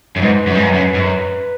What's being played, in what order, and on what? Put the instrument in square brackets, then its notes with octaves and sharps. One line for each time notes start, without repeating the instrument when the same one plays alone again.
[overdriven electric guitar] F#2
[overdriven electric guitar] G#2 [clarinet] B4
[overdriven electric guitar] F#2
G#2
F#2
F#2
G#2
F#2